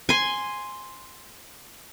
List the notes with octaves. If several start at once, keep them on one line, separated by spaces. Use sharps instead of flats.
G#5 C6